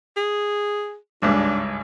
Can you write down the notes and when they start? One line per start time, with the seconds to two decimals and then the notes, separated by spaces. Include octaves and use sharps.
0.17 G#4
1.22 G#1 C#2 G2 D4